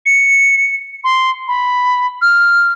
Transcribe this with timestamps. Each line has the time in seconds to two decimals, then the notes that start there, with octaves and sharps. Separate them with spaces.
0.06 C#7
1.04 C6
1.48 B5
2.22 F6